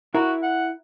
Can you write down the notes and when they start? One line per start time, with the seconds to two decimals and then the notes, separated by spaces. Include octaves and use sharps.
0.15 E4 F#4 A#4
0.43 F#5